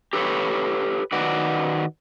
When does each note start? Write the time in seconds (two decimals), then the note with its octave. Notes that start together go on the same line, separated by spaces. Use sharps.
0.13 G4 A4 B4 C#5
1.13 D#3 F#4 B4 D5